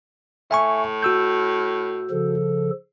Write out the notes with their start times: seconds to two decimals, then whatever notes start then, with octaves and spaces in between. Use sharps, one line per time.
0.51 A2 E5 G#5 C#6
1.03 F#4 E6 G6
2.11 C#3 F3 A4